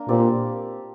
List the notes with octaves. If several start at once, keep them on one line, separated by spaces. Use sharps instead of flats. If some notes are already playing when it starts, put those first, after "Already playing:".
Already playing: A#3 D4 A#4
A#2 C4 G4 D5